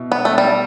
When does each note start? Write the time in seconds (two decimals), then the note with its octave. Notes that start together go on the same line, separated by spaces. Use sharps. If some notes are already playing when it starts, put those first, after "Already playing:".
Already playing: B2 E4
0.12 B3
0.25 A3
0.38 G3